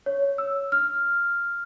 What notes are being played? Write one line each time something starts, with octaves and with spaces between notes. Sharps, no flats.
C#5
E6
F6